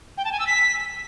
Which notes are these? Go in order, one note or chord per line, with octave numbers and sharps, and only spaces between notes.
G5
A5
G#5
E6
B6